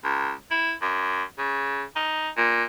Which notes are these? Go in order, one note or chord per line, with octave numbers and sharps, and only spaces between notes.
C#2
E4
F#2
C#3
D#4
A#2